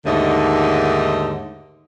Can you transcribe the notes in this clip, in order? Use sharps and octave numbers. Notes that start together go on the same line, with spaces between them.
D#2 G#2 D3 A3 D#4